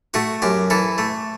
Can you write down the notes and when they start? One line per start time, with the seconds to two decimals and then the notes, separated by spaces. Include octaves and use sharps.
0.14 A3 F#4
0.42 F#2 G4
0.70 E3 A4
0.98 A3